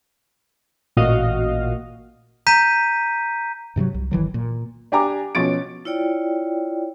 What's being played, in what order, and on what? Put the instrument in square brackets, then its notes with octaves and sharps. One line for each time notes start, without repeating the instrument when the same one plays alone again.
[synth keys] A1 A#2 F#4 D#5 F5
[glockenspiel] A#5 G6 B6 D#7
[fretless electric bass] G2 C3 F3 F#3
C2
G1 D#3 E3 F#3
A#2
[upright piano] D4 G4 G#5 A#5 D6
B2 F3 C#4 A6 D7
[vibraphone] E4 F4 C#5 D5 G5